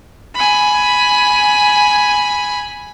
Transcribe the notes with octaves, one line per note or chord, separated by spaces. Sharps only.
G#5 B5